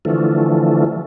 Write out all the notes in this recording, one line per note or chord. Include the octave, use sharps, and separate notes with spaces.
D3 E3 F3 A3